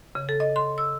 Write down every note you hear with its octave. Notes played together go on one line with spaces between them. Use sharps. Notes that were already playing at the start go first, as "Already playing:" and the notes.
C#3
A4
D#5
C6
E6